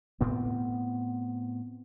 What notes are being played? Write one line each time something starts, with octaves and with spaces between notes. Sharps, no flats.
A2 B3 C4